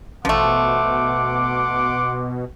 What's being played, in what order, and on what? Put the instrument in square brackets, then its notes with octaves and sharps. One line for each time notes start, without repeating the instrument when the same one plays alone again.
[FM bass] A1 [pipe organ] B2 [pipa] F3 A3 [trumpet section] F#5 C6 D6